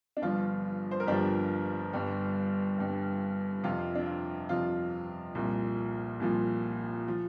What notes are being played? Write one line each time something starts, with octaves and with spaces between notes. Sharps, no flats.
D4
G1 G2 F3 F4
C5
A#4
G1 G2 F3 D4 G4
G1 G2 G3
G1 G2 G3
F2 C3 F3 F4
D4
F4
F2 C3 F3 F4
C2 A#2 F3
C2 A#2 F3
F3